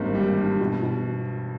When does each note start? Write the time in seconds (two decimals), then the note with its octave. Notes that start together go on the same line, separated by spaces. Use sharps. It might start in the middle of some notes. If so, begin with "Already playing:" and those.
Already playing: G#1 G2 G3 A#3
0.15 G3
0.37 G2
0.61 B2
0.83 B2